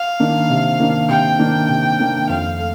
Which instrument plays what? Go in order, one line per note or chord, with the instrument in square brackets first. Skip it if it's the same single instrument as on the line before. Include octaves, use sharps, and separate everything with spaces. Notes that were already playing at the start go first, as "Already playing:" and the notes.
Already playing: [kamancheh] F5
[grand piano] D#3 A#3 D4
C3
D#3 A#3 D4
[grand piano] C3 [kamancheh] G5
[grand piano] D#3 A#3 D4
C3
D#3 A#3 D4
[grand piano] F2 [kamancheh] F5
[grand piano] A3